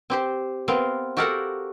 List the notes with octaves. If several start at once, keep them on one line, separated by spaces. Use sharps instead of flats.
C4 G4 C5
B3 C4 A#4 F5
F#4 G4 A4 A#4 F5 F#5